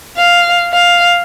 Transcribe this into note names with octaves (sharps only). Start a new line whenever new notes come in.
F5
F5